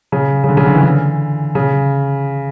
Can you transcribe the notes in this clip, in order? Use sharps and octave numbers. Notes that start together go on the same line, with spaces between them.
C#3
C#3
D3
C#3
D3
E3
D3
C#3